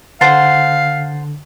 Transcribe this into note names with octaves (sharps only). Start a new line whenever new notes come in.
D3 C5 F5 F#5 A5 A6 C7